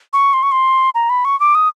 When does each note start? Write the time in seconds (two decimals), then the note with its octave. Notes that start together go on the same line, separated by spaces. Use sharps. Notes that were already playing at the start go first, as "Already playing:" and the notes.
0.13 C#6
0.34 C6
0.43 C#6
0.52 C6
0.95 A#5
1.10 B5
1.25 C#6
1.40 D6
1.55 D#6